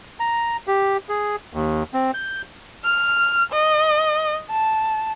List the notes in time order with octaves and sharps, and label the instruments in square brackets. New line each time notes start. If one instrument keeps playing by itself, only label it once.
[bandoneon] A#5
G4
G#4
D#2
C4
G6
[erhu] F6
D#5
A5